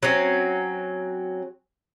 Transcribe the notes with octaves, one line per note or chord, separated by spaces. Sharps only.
F#3 C4 C#4